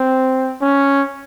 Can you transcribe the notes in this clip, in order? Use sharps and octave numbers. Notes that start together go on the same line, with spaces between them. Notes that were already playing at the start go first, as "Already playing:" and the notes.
Already playing: C4
C#4